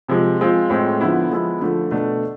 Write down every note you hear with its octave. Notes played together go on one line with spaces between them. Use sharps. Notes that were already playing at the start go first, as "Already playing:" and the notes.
C3 F3 G#3
F3 G#3 C4 F4
A2 G#3 C4
D3 F3 B3 E4
F3 G#3 B3 E4
D3 F3 A3
B2 A3 D4